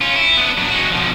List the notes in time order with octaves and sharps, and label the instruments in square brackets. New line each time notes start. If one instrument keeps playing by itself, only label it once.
[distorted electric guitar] C#4 F4
E4
B3 D4
F#3 D4
G#3 F#4
B2 F3